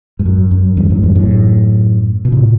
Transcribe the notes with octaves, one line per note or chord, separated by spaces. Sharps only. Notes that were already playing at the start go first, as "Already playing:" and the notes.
G2
F#2
F#2
E2 G2
F#2 A2
E2 G2
F#2 A2
B2
A2 C3